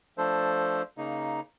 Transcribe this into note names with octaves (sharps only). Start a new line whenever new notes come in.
F3 A3 D4 A4 C5
C#3 A#3 D#4